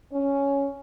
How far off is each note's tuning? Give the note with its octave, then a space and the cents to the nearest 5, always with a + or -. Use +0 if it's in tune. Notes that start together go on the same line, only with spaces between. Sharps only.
C#4 +5